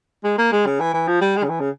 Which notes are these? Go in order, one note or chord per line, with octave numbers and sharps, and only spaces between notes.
G#3
A#3
G#3
C#3
E3
E3
F3
G3
G#3
C#3
E3
C#3